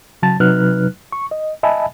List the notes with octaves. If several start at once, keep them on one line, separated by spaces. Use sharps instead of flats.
C#3 F#3 A5 A6
C3 F#3 D#4 B4 F6 F#6
C#6
D#5
D#5 E5 G#5 A5 B5